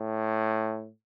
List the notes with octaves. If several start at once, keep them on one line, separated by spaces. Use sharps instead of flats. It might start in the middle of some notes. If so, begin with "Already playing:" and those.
Already playing: A2